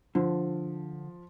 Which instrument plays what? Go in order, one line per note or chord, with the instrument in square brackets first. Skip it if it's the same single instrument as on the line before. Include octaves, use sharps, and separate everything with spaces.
[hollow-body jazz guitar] D3 [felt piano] F3